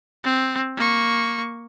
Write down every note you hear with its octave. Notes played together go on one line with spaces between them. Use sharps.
C4
A#3 C#6